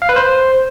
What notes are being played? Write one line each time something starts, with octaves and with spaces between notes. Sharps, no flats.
F5
B4
C5